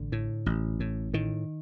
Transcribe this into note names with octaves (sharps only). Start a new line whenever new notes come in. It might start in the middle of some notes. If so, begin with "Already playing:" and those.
Already playing: A1 D3
A2
A1
A2
A2 D#3